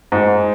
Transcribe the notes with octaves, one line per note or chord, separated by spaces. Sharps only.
G#2